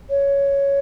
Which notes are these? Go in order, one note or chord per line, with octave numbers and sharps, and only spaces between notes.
C#5